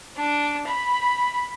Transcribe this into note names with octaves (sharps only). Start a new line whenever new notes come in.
D4
B5